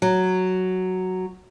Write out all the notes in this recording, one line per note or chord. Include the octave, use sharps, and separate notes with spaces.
F#3